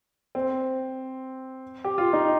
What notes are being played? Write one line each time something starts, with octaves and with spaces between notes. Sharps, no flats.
C4
G4
F4
D#4